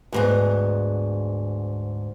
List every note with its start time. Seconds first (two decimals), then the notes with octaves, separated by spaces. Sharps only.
0.12 D2 G#2 B3